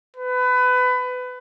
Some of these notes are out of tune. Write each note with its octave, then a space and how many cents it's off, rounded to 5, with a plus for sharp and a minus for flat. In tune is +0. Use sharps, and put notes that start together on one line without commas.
B4 +25